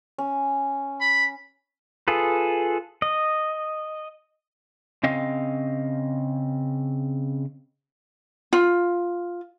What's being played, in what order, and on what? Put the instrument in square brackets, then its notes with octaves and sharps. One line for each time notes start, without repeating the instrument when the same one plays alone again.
[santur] C#4
[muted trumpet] B5
[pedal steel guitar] F4 G#4 A4 B4
D#5
[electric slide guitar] C#3 C4 D#5 F5
[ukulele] F4